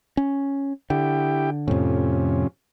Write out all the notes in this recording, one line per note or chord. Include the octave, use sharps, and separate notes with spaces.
C#4
D3 E4 G4 G5
F2 A2 C3 F3 C#4